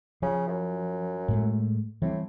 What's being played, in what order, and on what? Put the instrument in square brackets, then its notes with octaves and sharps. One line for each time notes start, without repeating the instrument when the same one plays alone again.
[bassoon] C#3 [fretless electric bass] F3
[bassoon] F#2
[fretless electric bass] A2 G#3 A3
[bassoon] A2 [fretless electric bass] E3 G3 C4